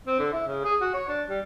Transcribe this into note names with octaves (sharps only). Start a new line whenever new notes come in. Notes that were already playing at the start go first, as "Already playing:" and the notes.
C4
D3
E4
C#3
G#4
F#4
C#5
D4
G3